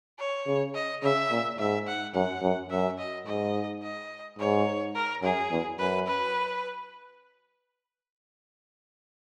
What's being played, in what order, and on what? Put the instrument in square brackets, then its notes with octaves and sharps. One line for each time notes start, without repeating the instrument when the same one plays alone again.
[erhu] C#5
[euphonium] C#3
[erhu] D#5
[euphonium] C#3 [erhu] E5
[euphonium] A#2
[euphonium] G#2 [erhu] E5
[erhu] F#5
[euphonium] F#2 [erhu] F#5
[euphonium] F#2
[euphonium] F#2 [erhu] E5
[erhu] D#5
[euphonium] G#2 [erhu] D#5
[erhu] D#5
[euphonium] G#2 [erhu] C#5
[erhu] A#4
[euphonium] F#2 [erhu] G#4
[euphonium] E2
[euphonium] F#2 [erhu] B4
[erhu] B4